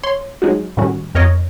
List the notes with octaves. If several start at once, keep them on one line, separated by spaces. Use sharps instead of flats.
C#5 C6
F#3 G#3 D#4 F#4
A2 D#3 G3 C#4 F#4
F2 A#4 C#5 D#5